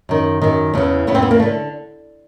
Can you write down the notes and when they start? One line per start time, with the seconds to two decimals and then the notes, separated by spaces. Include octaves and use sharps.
0.09 F#2 D#3
0.42 F#2 D#3
0.74 E2 C#3 E3
1.07 E2 C#3 E3 B3
1.15 C4
1.22 B3
1.31 A#3
1.40 A3
1.42 D3